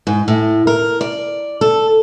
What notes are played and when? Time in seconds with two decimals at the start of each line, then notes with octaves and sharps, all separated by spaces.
0.07 G#2
0.28 A2
0.67 A#4
1.01 D5
1.61 A4